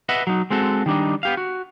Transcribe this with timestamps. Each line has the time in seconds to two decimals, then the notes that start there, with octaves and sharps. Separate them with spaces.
0.09 B4 D#5 E5 F#5
0.27 F#3 D#4
0.50 G#3 C4 F#4 A4
0.86 D#3 G3 D4 D#4
1.23 B3 G4 F5
1.37 F#4